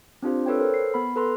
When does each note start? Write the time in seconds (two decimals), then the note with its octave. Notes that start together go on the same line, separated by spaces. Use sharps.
0.23 C4 D4 F4 G4 C5
0.46 A4 B4 C#5 G5
0.59 A4 A#4 C5
0.74 C7
0.94 B3 B5
1.16 A4 B4 A#5 C6